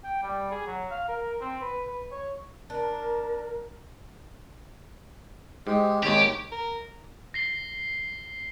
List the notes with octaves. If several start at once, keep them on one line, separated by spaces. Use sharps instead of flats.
G5
G3
G#4
F#3
F5
A#4
C4
B4
B4
C#5
D4 A#4
G#2 G#3 G4
G#1 D#2 G#3 G4 C#5
A#4
A#6 C7 G7